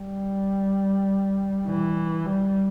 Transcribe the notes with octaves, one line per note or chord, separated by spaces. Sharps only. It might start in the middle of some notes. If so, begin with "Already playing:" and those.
Already playing: G3
E3
G3